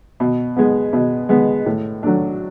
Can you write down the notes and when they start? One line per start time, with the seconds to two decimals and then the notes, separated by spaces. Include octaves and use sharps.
0.20 B2
0.56 G#3 B3
0.93 B2
1.29 G#3 B3
1.66 A2
2.03 F#3 A3 D4